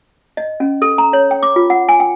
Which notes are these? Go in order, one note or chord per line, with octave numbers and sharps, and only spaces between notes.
D#5
C#4
A4
A#5
C#5
G5
D6
F4
F#5
G#5
G5